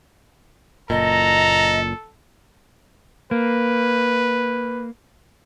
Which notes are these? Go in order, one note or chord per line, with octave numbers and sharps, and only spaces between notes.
F#1 A#2 A4 D#5 A#5
A#3 B4